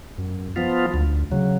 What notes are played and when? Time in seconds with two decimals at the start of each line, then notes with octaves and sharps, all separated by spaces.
0.18 F#2
0.56 F3 B3 F4
0.94 D2
1.31 C#3 F#3